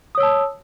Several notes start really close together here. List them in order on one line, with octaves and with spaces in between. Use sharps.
D#6 C#5 E6 A5